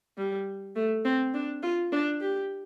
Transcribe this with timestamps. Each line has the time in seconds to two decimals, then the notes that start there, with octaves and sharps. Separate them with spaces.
0.18 G3
0.75 A3
1.05 C4
1.34 D4
1.62 F4
1.92 D4
2.21 G4